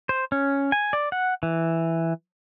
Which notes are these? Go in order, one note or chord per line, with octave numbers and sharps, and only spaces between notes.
C5
C#4
G#5
D5
F#5
E3